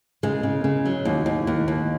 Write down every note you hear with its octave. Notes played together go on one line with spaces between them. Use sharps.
C#3 G#3
C#3
C#3
F#3
D#2
D#2
D#2
D#2